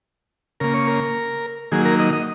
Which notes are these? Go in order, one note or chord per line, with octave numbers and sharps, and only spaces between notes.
C#3 A#3 A#4
C#5
A#4
D#3 F#3 A#3 G#4
A#4
D#5
D#5